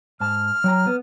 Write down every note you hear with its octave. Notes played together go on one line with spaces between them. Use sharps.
G#2 A5 F6
F#3 G5 A#5
B3